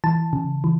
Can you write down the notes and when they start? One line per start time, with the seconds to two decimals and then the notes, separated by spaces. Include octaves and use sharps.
0.04 E3 A5
0.33 C#3
0.64 E3